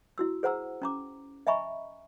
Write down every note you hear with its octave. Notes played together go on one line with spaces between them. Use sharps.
E4 F#4 E6
G#4 C5 F#5 A#5 E6
C#4 A#5 D6
D#5 E5 G#5 A#5 B5 C#6